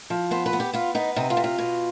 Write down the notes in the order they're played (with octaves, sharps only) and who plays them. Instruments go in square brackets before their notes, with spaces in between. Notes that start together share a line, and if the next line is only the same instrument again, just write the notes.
[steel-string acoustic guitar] F3
B3 C5
B4
B3
G4
B3 F4
B3 D#4
C3 D#4
F4
C3
F4
B2